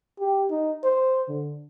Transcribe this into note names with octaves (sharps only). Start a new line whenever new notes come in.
G4
D#4
C5
D3